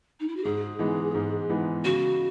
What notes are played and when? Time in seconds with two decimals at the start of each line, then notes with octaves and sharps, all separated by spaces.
0.20 D#4
0.28 E4
0.36 F#4
0.44 G#2 G#4
0.79 E3 G#3 B3 D#4
1.15 G#2
1.50 E3 G#3 B3 D#4
1.84 C#3 F#4